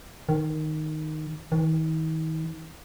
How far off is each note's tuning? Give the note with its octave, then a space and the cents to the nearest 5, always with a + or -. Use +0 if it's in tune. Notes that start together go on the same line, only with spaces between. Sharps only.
D#3 -5
D#3 +40